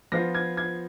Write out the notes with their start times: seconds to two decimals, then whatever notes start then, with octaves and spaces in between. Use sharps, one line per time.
0.12 F3 B3 F4 A#6
0.35 G#6
0.57 G#6